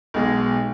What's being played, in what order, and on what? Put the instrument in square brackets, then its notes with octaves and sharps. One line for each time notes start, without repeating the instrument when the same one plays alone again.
[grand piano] B1 B2 G#3